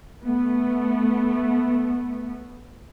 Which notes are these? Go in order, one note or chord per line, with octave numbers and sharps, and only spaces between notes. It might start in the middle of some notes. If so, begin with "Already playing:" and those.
A3 B3